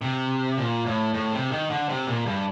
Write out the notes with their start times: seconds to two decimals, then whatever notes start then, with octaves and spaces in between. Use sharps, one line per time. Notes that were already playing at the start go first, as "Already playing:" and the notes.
0.01 C3
0.58 A#2
0.86 A2
1.14 A2
1.32 C3
1.51 D#3
1.70 D3
1.89 C3
2.07 A#2
2.26 G2